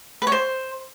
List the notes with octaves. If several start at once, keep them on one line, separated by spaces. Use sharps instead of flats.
B4
C#5
C5